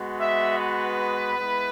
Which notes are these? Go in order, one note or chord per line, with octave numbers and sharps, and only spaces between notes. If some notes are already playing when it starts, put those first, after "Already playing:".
Already playing: G#3 B3 F#4
E5
B4
G#3 B3 E4